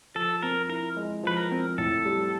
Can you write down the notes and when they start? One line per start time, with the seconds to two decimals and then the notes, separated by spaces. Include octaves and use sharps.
0.15 F3 A4
0.43 C4 A#4
0.69 E4 A#4
0.97 G#3
1.24 F3 B4
1.37 A#4
1.51 C4
1.78 A2 A4
2.05 G3